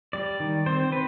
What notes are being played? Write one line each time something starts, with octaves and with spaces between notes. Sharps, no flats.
G3 D5
D#3
C4 C5
C4 B4